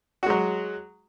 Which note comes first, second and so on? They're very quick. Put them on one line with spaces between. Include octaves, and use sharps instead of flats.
F#4 G#3 F#3